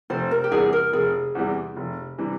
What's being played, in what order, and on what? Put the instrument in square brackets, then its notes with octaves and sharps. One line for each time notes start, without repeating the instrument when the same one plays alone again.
[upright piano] F1 [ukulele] C5
[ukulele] A#4
G4
[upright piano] E2 C3 E3 G3 [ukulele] G#4
[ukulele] A#4
[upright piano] F1 [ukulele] G#4
[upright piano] E2 C3 E3 G3
F1
C3 E3 G3